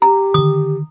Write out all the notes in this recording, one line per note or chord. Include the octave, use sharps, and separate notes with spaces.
G4 A#5
D3 D#3 D#6